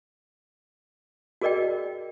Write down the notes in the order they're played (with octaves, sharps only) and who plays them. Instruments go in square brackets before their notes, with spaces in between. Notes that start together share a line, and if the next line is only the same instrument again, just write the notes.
[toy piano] F#4 G#4 A#4 D5 D#5 G5